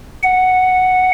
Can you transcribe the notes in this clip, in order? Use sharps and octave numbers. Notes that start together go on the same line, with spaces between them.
F#5